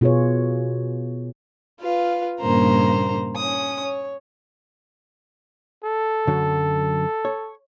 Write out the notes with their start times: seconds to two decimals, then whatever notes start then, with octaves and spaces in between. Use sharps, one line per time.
0.01 B2 F4 G#4 B4 C#5
1.80 F4 B4 F5
2.41 G2 A#2 C#3 A#3 C5 A#5
3.37 C#4 D#6
3.83 C#5
5.84 A4
6.27 F#2 D3 F#3
7.25 C#5